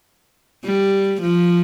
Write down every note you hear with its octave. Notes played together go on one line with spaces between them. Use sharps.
G3
F3